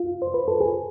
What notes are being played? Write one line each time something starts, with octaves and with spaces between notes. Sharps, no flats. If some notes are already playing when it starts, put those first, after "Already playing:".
Already playing: F4
C5
B4
A4
G#4